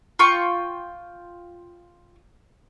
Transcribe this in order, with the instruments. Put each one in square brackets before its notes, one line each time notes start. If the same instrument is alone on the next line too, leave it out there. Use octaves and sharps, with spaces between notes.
[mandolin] F4 G5 C#6